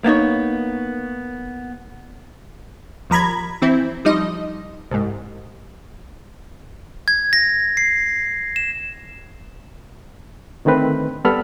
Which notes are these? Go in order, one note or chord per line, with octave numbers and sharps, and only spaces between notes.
A#3 B3 D#4 C#5
D#2 F3 A#5 B5 G#6
E3 C4 E4
F3 G3 D#4 D#5
C2 G#2
G#6
A#6
C7
E7
D3 D#3 A3 C4 B4
G3 B3 A4 B5 F6